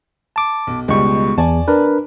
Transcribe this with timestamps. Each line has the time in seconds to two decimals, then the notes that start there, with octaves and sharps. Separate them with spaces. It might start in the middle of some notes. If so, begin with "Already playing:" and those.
0.36 A5 D6
0.67 B1
0.88 C#2 B2 G3 G#3 C#6
1.38 E2 D5 G#5 A5
1.68 D4 A#4 B4